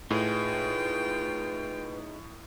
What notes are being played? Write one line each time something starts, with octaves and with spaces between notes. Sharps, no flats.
A2 D#4 F4 G#4 B4 G5